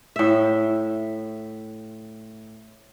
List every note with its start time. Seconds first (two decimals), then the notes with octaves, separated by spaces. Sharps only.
0.16 A2 E5